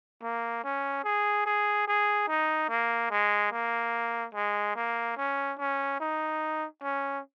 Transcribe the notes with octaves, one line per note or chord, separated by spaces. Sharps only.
A#3
C#4
G#4
G#4
G#4
D#4
A#3
G#3
A#3
G#3
A#3
C#4
C#4
D#4
C#4